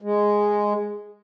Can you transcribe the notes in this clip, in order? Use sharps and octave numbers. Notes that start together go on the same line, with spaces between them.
G#3